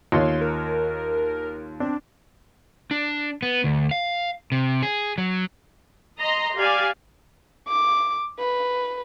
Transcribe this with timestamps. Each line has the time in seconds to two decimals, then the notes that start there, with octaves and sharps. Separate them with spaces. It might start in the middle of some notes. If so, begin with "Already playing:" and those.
0.12 D#2 F4 C#5 C6
0.41 A#4
1.80 C4 D4
2.91 D4
3.42 B3
3.64 D2
3.91 F5
4.52 C3
4.83 G#4
5.18 F#3
6.19 D#5 A#5 C6
6.56 G4 D5 F5 G#5
7.68 D6
8.39 B4